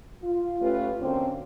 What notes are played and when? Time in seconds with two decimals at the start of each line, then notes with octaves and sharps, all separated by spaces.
0.23 F4
0.61 A3 C#4 F4 G4 B4
1.00 D3 A#3 C4 C#4 F#4 C5